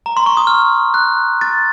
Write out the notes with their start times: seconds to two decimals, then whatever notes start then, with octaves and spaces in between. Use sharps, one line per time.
0.06 A#5
0.17 C6
0.26 C#6
0.37 D#6
0.47 F6
0.94 F#6
1.41 A6